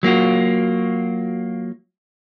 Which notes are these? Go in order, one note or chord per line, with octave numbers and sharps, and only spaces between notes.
F#3 A#3 F4 F#4